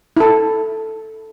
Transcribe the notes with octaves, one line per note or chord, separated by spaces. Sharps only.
E4 A4